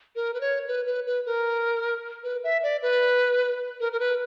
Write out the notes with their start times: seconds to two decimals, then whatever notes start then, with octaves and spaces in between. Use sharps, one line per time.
0.16 A#4
0.34 B4
0.41 C#5
0.68 B4
0.86 B4
1.07 B4
1.26 A#4
2.24 B4
2.44 E5
2.63 D5
2.82 B4
3.80 A#4
3.93 A#4
4.00 B4